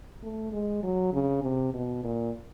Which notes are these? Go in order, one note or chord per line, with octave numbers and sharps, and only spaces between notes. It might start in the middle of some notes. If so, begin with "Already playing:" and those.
A3
G#3
F#3
C#3
C3
B2
A#2